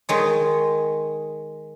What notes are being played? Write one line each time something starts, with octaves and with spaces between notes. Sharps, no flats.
D#3 G#3 C#5